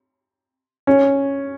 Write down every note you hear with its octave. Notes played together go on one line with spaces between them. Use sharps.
C#4